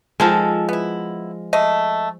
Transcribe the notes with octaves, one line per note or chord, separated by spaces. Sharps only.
D#3 F3 G#3 A4
B3 E4
A3 D#5